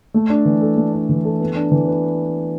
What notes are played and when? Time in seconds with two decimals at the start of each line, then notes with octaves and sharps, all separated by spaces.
0.14 A3
0.30 D4
0.45 E3
0.61 A4
0.77 A3
0.93 D4
1.09 E3
1.25 A4
1.40 B3
1.56 D4
1.72 E3
1.88 B4